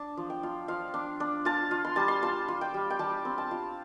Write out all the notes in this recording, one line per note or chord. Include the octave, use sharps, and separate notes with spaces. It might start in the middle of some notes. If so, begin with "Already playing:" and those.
Already playing: D4 A5
F3
G5
F4
F3 F5
D4
D4
F4 A5
F4
C6
G3 A5
C6
F4 A5
F4
G5
G3
G5
G3 A5
C4
A5
F4